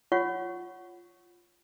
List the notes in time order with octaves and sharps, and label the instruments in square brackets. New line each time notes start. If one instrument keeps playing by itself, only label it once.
[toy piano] F4 C#5 F#5 C#6